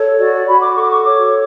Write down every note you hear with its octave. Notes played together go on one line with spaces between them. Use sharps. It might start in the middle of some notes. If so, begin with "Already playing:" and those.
Already playing: A4 C#5
F#4 D5
D5
F#4 B5
D6
A4 C#6
D6
C#6
C#5 D6